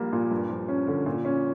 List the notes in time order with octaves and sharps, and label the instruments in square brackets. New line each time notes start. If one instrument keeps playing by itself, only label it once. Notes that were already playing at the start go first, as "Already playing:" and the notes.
Already playing: [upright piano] A#1 G3 A#3
A#2
G2
F3
C#4
D3
A#2
C#4